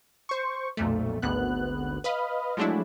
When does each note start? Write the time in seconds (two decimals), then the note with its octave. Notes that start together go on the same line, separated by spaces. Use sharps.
0.29 C5 C#6
0.77 B1 F2 A#2 A3
1.22 G#1 D2 B3 F#6
2.04 B4 D#5 F5 B5
2.57 F3 F#3 G#3 A3 D4 E4